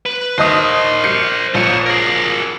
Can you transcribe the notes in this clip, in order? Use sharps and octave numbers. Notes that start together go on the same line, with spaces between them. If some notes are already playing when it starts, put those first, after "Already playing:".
B4
D#2 A#4 C5 D#5 D#6
G6 C7 C#7
A#1 C5 C#5
G#4 A#4